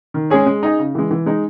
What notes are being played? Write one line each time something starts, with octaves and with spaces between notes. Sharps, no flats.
D#3
G#3 C#4 G#4 C#5
G#3
D#4 G#4 D#5
C#3
E3 G#3
E3
G#3 D#4